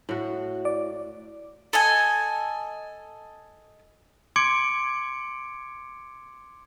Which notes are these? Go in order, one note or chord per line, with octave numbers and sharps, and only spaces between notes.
A2 F#4
D5
A4 D#5 G#5
C6 D6 G#6 C#7 D7